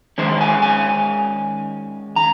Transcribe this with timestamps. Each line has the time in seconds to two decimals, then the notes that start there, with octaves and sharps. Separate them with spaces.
0.18 D#3 G#3 C#4 C5
0.41 G#5
0.62 G#5
2.16 A#5